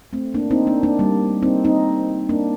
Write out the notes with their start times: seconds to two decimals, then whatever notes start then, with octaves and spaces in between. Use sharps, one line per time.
0.13 A3 C4
0.34 A#3 D4
0.51 C4 D#4
0.66 A#3 D4
0.83 A#3 D4
0.99 G3 A#3
1.43 C4 D#4
1.64 C4 D#4
2.29 A#3 D4